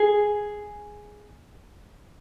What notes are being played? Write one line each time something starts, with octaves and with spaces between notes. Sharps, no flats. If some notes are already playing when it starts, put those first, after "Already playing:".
Already playing: G#4